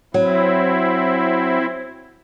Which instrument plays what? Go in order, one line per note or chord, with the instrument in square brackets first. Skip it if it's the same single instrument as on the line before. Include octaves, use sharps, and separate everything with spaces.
[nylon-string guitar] F#3 [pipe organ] C4 E4